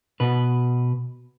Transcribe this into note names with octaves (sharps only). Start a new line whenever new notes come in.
B2 B4